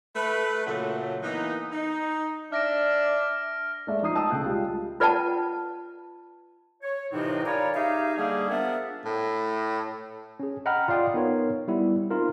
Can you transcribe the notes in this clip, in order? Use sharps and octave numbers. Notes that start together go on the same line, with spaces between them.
A3 B4
A#2 C#3 F#3 A3
E3 A#3 B3 D#4
D#4
D4 E5 F6 A#6 D7
G#3 A3 D5 E5
F3 D#4 D#6 C7
D#5 G5 A5 D#6 E6
C#2 A3 G5 F#6
G3 G#3 F4
F4 B4 D5 F#5 G5 A5
C#5
F2 A2 C3 E3 C4 D#4
A#4 C#5 D5 F5 G#5 B5
D#4 G4 G#4 E5 F5
D3 G3 A#3 G#4
F3 B3 D4 A#4 E5
A2
C#4 G#4
D#5 F#5 G5 A#5 B5 F6
F4 D5 F5 G5 D#6
B3 D#4 A#4 C#5
G3 B3 E4
C4 D#4 F4 A#4